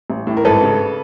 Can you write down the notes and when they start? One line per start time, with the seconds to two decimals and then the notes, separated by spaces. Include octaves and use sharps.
0.10 A1
0.27 A2
0.37 A#4
0.45 G#1 A4 B4
0.63 C#3